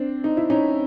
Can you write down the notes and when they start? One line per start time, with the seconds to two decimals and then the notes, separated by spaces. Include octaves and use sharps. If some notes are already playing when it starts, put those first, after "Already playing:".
Already playing: C4 D4
0.24 D#4
0.37 E4
0.50 C#4 D#4